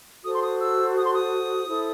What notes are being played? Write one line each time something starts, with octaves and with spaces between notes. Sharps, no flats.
F#4 A4 C5 D#6
C6
D#6
E6
D#6
C6
D#6
E4 A4 C5